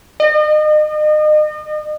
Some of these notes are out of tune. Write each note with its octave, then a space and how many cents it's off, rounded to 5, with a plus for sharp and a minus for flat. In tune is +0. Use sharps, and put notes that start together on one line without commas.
D#5 -35